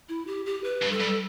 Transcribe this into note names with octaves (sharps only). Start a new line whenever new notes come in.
E4
G4
G4
B4
G2
A4
G2